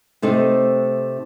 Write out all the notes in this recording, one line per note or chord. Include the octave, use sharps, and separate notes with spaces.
C3 A3 D#4 A4 C5